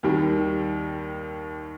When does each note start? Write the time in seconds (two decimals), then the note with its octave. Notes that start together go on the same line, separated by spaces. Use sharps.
0.03 D#2 D#3 G3